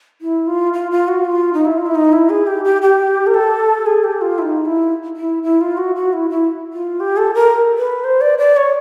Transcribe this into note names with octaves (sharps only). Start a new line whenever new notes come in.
E4
F4
F4
F4
F#4
F4
D#4
E4
F4
E4
D#4
E4
G#4
G4
G4
G4
A#4
A4
G#4
G4
F4
E4
D#4
E4
E4
E4
F4
F#4
F#4
E4
E4
F4
G4
A4
A#4
B4
C5
D5
D5
C#5